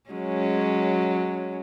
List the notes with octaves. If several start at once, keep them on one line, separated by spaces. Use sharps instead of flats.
F#3 G#3 C#4